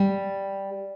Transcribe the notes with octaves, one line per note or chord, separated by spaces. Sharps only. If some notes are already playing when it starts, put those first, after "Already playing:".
Already playing: G3